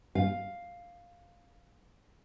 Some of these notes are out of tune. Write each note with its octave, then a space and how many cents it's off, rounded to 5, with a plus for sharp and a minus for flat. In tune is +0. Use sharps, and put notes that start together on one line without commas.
F5 +5